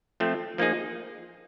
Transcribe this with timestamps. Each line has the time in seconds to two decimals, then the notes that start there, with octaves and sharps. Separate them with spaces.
0.20 F3 A3 C4
0.58 F3 A#3 D#4 G#4